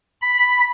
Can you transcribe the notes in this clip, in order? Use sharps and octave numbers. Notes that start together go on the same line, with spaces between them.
B5